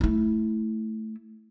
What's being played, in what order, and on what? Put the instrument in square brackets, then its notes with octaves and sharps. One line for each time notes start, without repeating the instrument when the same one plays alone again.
[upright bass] A3 E4